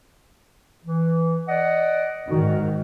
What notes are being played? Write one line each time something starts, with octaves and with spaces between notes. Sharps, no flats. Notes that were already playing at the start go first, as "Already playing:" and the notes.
E3
D5 D#5 F#5
G#2 D#3 F#4